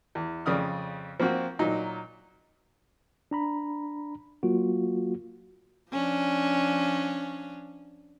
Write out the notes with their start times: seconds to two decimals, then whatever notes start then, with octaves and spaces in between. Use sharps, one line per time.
0.15 E2
0.46 F2 C#3 D5 D#6 F6
1.20 F3 A#3 C4 F#4
1.59 A#2 F#3 D#4
3.31 D4 A#5 B5
4.43 F#3 A#3 F4 F#4
5.91 F3 C#4 D4